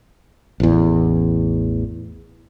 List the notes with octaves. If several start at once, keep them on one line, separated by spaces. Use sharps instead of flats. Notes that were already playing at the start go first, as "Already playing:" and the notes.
A1 E2